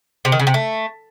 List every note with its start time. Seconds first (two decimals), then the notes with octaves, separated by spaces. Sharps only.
0.25 C3
0.32 D#3
0.39 C#3
0.47 C3
0.54 A3